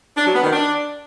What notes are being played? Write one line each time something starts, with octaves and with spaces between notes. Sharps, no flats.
D4
F#3
B3
D#3
D4